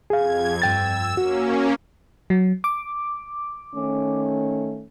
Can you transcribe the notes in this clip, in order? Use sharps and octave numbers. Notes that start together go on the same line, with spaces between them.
F2 G#4 F5 G#6
G2 G5 E6 A6
A#3 C#4 F#4
F#3
D6
D#3 A3 C#4